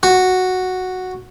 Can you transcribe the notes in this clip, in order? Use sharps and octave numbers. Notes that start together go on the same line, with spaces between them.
F#4